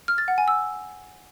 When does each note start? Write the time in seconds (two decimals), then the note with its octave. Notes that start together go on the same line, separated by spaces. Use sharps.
0.08 F6
0.18 A6
0.28 F#5
0.38 G#5
0.48 E6